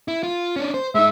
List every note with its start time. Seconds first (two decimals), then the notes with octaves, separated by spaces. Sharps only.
0.08 E4
0.23 F4
0.56 C#4 D4
0.74 C5
0.95 G#3 D#4 E5